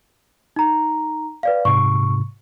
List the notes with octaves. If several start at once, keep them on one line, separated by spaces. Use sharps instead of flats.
D#4 A#5
B4 D5 F5
G#2 C3 C#6